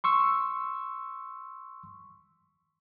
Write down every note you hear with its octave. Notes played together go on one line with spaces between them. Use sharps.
C6 C#6 E6